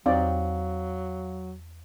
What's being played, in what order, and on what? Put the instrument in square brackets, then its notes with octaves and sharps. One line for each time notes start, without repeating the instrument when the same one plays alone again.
[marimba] E2 [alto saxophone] F#3 [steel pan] C4 D#4 D5 [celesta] F5